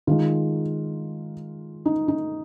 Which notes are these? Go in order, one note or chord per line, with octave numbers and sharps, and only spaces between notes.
D#3 G#3 D#4 F4
D#4
D#4